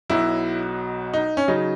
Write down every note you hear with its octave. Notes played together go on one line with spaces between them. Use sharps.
B1 B2 F#3 E4
D#4
C#4
C#3 F#3 D#4